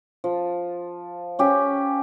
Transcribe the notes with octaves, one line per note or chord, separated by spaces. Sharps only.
F3
C#4 G4